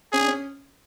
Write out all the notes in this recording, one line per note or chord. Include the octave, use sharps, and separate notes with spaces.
C#4 G#4
D4
C#4